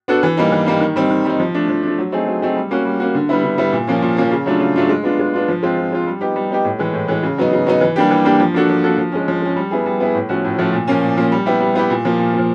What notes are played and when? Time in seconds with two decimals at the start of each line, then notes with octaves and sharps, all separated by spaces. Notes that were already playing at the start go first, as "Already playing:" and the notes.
0.08 B3 D4 F#4 A4
0.23 E3
0.37 G3 A#3 D#4
0.52 E3
0.66 G3 A#3 D#4
0.81 D#3
0.96 G3 C4 D#4
1.10 D#3
1.25 G3 C4 D#4
1.39 F3
1.54 A3 D4
1.69 F3
1.83 A3 D4
1.98 F#3
2.12 A3 C4 D#4 G#4
2.27 F#3
2.42 A3 C4 D#4 G#4
2.56 G3
2.71 A#3 C#4 F#4
2.85 G3
3.00 A#3 C#4 F#4
3.15 D3
3.29 G3 B3 E4
3.44 D3
3.58 G3 B3 E4
3.73 A#2
3.87 F3 A#3 C#4
4.02 A#2
4.17 F3 A#3 C#4
4.31 C#3
4.46 F#3 A3 D4 F4
4.60 C#3
4.76 F#3 A3 D4 F4
4.89 G#3
5.04 B3 D4 F4
5.19 G#3
5.34 B3 D4 F4
5.48 F3
5.63 G#3 C4 F4
5.77 F3
5.92 G#3 C4 F4
6.07 G3
6.21 B3 D#4 G4
6.36 G3
6.51 B3 D#4 G4
6.65 A2
6.79 E3 G#3
6.94 A2
7.08 E3 G#3
7.23 C#3
7.38 F#3 B3 D#4
7.53 C#3
7.67 F#3 B3 D#4
7.81 E3
7.96 G3 A#3 D4 G4
8.11 E3
8.25 G3 A#3 D4 G4
8.40 F3
8.54 A#3 D4 F#4 A4
8.69 F3
8.84 A#3 D4 F#4 A4
8.98 F3
9.12 G#3 C#4
9.28 F3
9.42 G#3 C#4
9.56 G3
9.71 B3 E4 G#4
9.86 G3
10.00 B3 E4 G#4
10.15 A2
10.29 F3 A3 C#4 F#4
10.45 A2
10.59 F3 A3 C#4 F#4
10.73 A#2
10.87 F3 A#3 C#4
11.03 A#2
11.17 F3 A#3 C#4
11.32 G3
11.46 B3 E4 G4
11.60 G3
11.75 B3 E4 G4
11.90 A#2
12.05 F3 A#3
12.19 A#2
12.34 F3 A#3